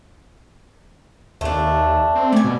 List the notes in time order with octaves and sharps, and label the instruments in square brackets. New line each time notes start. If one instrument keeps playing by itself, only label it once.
[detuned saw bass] D#2 [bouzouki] A3 D4
[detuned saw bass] C4
[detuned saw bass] A3 [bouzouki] D5 G#5
[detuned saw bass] B2